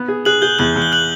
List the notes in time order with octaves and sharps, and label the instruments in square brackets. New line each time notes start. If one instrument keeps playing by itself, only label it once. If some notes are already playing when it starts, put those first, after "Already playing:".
Already playing: [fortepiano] B3
G#4
[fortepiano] G#4 [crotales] F#6 F#7
[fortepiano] G#4 [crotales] G6 G7
[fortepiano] E2 [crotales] F#6 F#7
[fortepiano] E2
[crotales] G7
F#6 F#7